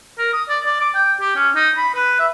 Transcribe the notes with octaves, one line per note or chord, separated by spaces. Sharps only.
A#4
D#6
D5
D5
D6
G5
G4
C#4
D#4
B5
B4
E5